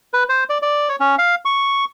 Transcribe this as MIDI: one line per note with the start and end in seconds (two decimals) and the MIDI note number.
0.14 0.24 71
0.29 0.44 72
0.49 0.58 74
0.62 0.89 74
0.89 0.96 73
1.00 1.15 61
1.19 1.35 77
1.45 1.85 85